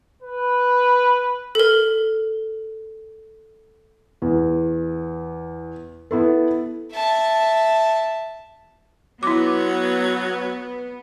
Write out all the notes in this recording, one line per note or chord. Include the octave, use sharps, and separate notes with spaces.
B4
A4 A#4
E2
B3 E4 A4
E5 A5
F#3 B3 E4 D6